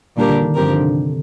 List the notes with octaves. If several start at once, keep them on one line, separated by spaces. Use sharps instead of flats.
A#2 D3 G3 D4 G4 A#4
D3
D#3
G2 D3 F3 C4 G4 A#4
D3
C3